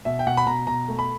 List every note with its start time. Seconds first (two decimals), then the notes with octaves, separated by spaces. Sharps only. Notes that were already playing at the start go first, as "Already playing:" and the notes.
0.05 B2 E5
0.19 G5
0.27 B2 F#5
0.37 B5
0.46 B2 A#5
0.67 B2 A#5
0.88 A3
0.99 B5